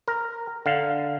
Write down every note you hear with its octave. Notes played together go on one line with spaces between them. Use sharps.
A#4
D3 F5